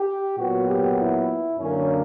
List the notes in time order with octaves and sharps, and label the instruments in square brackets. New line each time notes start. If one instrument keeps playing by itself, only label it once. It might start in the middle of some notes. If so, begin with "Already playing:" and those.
Already playing: [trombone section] G4
A#2 F#3 B3 F#4
G4
E4
F#2 D3 A#3 C#4